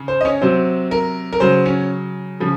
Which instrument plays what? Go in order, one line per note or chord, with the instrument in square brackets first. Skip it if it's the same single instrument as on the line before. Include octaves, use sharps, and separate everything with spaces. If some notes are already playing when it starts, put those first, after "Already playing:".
Already playing: [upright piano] C#3
C5
D#5
C#4 C#5
C3 F#3 C5
A#4
A#4
C#3 F#3 C5
C#4 C#5
C#3 F3